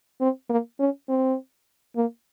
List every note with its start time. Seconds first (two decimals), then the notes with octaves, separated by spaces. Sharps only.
0.21 C4
0.50 A#3
0.79 C#4
1.09 C4
1.96 A#3